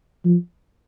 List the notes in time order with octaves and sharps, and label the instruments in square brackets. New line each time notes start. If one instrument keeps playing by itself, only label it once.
[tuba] F3